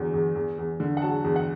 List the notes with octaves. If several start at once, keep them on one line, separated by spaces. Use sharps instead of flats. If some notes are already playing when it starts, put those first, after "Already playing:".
Already playing: E2 D3 F#3
E2
E2
E2
D3
F#5
F#3 A5
E2
F#5